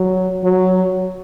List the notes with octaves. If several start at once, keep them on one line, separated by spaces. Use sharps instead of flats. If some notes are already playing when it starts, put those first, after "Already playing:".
Already playing: F#3
F#3